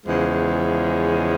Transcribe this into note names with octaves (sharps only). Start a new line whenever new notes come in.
E2 C#3 F3 G#3